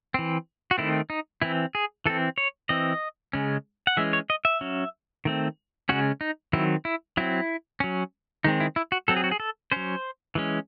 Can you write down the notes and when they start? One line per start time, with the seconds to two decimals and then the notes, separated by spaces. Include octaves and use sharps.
0.14 E3 C4
0.71 F#4
0.78 D#3 A3 C4 E4
1.10 D#4
1.42 E3 C4 E4
1.75 G#4
2.06 E3 C4 A4
2.38 C#5
2.69 E3 C4 D#5
3.33 C#3 G#3 C#4
3.87 F#5
3.97 E3 G#3 C#4 E5
4.13 C#5
4.30 D#5
4.45 E5
4.61 F#3 C#4
5.25 D#3 A3 C4
5.89 C#3 G#3 C#4 F#4
6.21 D#4
6.53 D#3 F#3 C4 E4
6.85 E4
7.17 F#3 C4 E4
7.80 F#3 C#4
8.44 D#3 G#3 C4 D#4
8.60 E4
8.76 E4
8.92 F#4
9.08 F#3 C4 A4
9.17 G#4
9.24 F#4
9.31 G#4
9.40 A4
9.72 F#3 C#4 C5
10.35 E3 G#3 C#4